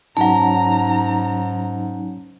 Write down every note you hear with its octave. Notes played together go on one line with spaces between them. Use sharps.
G#2 F#3 C#4 D#4 F#5 A5 A#5